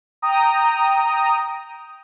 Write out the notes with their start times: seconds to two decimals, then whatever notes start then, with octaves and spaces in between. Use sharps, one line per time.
0.22 G5 A#5 D#6